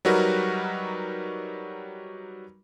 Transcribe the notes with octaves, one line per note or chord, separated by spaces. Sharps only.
F#3 G3 D#4 F#4 A#4 B4